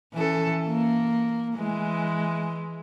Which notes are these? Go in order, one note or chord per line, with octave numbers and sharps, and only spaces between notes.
E3 C#4 A4
A#3
E3 G#3